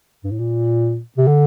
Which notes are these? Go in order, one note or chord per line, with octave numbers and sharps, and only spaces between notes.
G2
A2
A#2
C3
D3